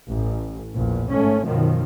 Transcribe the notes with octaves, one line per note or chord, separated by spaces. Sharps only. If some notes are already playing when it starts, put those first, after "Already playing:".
A1
A#1 E2
G#2 A3 C#4
F#2 B2 D#3 F3